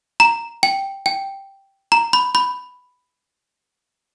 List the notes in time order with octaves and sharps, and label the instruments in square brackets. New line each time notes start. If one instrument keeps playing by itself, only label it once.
[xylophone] A#5
G5
G5
A#5
B5
B5